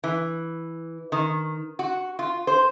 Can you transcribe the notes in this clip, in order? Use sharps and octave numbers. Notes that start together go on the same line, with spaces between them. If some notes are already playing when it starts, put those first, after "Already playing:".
E3
D#3
F#4
F4
C5